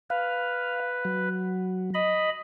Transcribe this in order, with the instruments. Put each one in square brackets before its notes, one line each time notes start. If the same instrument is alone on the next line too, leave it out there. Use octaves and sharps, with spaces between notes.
[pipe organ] B4 [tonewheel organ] F5
[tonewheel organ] F#3
[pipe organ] D#5 B5